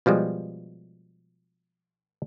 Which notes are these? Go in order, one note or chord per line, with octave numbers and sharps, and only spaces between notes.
B2 F3 G3 G#3